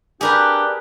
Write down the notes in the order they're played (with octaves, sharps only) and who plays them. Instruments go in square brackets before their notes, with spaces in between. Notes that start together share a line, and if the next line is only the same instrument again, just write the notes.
[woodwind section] D4 G4 [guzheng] G#4 A#4 B4